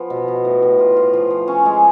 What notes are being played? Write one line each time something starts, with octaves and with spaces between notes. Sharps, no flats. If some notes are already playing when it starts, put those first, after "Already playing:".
Already playing: F3 B3
B2
B2
A2
A2
F4
F4
F3
F3
C#4
G#3